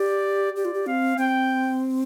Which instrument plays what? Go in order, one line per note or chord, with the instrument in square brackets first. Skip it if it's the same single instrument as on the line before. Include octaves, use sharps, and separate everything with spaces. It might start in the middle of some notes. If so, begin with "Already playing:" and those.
Already playing: [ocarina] G4 [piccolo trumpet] D5
[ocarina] G4 [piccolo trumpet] D5
[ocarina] F4
G4
[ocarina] C4 [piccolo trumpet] F5
[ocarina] C4 [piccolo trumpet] G5